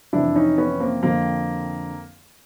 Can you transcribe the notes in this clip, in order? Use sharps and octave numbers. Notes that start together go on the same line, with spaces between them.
F2 C3 E3 D4 E4
C#4 D#4
B3 C#4
A#3 C4
F2 D3 F3 A#3 C4